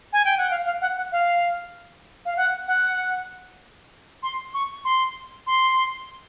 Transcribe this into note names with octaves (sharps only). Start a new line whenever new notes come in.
G#5
G5
F#5
F5
F5
F#5
F#5
F5
F5
F#5
F#5
C6
C#6
C6
C6